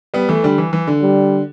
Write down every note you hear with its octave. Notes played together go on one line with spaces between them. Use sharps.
G3 B3
E3 A3
D3 G3
E3
E3
D3
G3